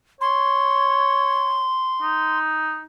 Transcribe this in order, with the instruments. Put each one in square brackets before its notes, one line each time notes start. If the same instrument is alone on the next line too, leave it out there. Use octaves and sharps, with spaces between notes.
[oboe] C#5 [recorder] C6
[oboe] D#4